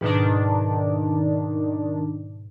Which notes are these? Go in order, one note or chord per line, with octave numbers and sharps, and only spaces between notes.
G#2 B2 D#3 D4